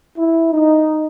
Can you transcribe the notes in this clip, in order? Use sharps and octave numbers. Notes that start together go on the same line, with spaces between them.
E4
D#4